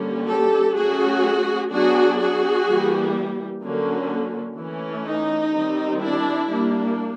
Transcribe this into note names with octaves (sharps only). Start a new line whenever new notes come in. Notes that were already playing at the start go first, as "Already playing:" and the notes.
Already playing: D3 G3 A#3 C#4
G4 A4
F#3 A3 C#4 F#4 G#4
F#3 B3 D4 F#4 G#4
F#4 G#4
E3 G3 A#3
D3 F#3 A#3 C#4
E3 A3 C#4
D#4
D#3 G3 C4
D4 E4
G3 A#3 D4